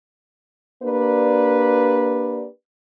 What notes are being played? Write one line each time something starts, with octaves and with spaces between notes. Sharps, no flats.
A#3 D4 G4 B4 D5